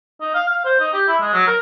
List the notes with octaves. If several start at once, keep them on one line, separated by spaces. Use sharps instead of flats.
D#4
F5
F5
C5
D#4
G4
E4
G#3
F#3
A#4